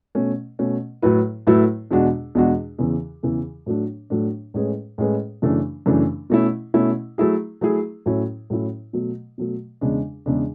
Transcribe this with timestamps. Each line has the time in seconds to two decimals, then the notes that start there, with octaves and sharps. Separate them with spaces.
0.15 B2 A3 C#4
0.59 B2 A3 C#4
1.02 A2 F#3 A3 E4 B4
1.47 A2 F#3 A3 E4 B4
1.91 E2 B2 G#3 D4 F#4
2.35 E2 B2 G#3 D4 F#4
2.78 E2 C#3 E3
3.23 E2 C#3 E3
3.66 A2 F#3 A3 D4
4.10 A2 F#3 A3 D4
4.54 A2 G#3 C#4 G#4 B4
4.98 A2 G#3 C#4 G#4 B4
5.42 F#2 C#3 E3 A3 D4
5.86 F#2 C#3 E3 A3 D4
6.30 B2 A3 C#4 E4
6.74 B2 A3 C#4 E4
7.18 F#3 A3 E4 G#4
7.61 F#3 A3 E4 G#4
8.06 A2 F#3 C#4 E4
8.50 A2 F#3 C#4 E4
8.93 B2 F#3 A3
9.38 B2 F#3 A3
9.81 E2 C#3 G#3 D4
10.26 E2 C#3 G#3 D4